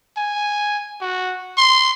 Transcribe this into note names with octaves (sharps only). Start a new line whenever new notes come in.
G#5
F#4
C6